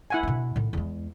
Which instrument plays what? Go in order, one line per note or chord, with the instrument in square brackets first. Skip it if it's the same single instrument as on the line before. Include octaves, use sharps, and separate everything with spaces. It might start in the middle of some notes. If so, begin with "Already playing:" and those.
[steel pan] E4 F#5 G#5
[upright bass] B2 D4
A2 D#3
E2 G#3